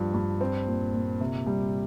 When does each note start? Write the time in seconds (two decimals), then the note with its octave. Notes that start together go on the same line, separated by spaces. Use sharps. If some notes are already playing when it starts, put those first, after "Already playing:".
Already playing: G2 F3
0.14 G2
0.41 C4
0.67 A#2
0.93 A#2
1.21 C3
1.46 G3